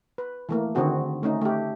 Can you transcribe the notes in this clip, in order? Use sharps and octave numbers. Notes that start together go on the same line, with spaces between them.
B4
E3 A3 A#3
D3 D#3 C4 F#4 G#4
A3 C#4 D#4
A3 G4